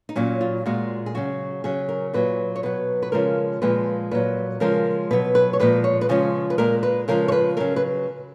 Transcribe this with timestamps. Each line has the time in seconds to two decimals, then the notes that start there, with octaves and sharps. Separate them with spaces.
0.09 D#4
0.16 A#2 F#3 C#4
0.41 F4
0.66 A#2 G#3 F#4
1.06 G#4
1.15 C#3 F#3 F#4
1.64 C#3 F#3 G#4
1.89 A#4
2.14 A#2 F#3 B4
2.56 C#5
2.63 B2 F#3 B4
3.02 B4
3.12 C#3 F3 G#3 A#4
3.62 A#2 F3 G#3 B4
4.11 A#2 F#3 B4
4.60 C#3 F3 G#3 A#4
5.11 B2 F#3 B4
5.35 B4
5.53 C#5
5.60 A#2 F3 G#3 B4
5.84 C#5
6.01 B4
6.09 C#3 F3 G#3 C#5
6.50 B4
6.58 A#2 G#3 A#4
6.83 B4
7.08 C#3 F3 G#3 A#4
7.28 C#5
7.32 B4
7.57 C#3 F#3 A#4
7.76 B4